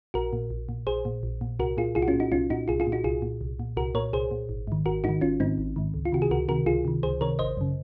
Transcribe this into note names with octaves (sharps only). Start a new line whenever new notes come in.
A#1 F#4 A#4
A#2
A#1
A#2
A#1 G#4 C5
A#2
A#1
A#2
C2 F#4 A#4
A#2 F4 G#4
C2 F4 G#4
F#4
C#4 F4
A#2
D#4 F#4
C2 C#4 F4
A#2 D#4 F#4
C2 F4 G#4
F4 G#4
A#2
D#4 F#4
C2 F4 G#4
A#2
C2
A#2
C2 F#4 A#4
A#2 A#4 C#5
C2 G#4 C5
A#2
G#1
G#2 D#3
G#1 F#4 A#4
G#2 D#4 F#4
D#3
G#1 C#4 F4
G#2 D#3 C4 D#4
G#1
G#2 D#3
C#2
F4
C3 D#3 F#4
G#4
C#2 F#4 A#4
C3 D#3 F#4 A#4
C#2 F4 G#4
C3 D#3
C#2 G#4 C5
C3 D#3 A#4 C#5
G#1 C5 D#5
F#2 C#3